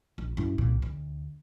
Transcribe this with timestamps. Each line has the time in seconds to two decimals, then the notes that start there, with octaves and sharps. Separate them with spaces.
0.18 A#1
0.37 F#2 E4
0.58 C2 A#2
0.82 D2